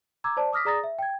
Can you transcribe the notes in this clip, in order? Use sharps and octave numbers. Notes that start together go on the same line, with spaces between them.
A#5 D6 E6 G#6
C5 D5 A5
D6 D#6 F6 A#6 B6
G#4 D5 A#5 D#6 A6 A#6
E5
G5 G#6